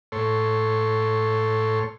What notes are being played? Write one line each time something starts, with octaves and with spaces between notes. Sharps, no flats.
A2 A4 C#5 C6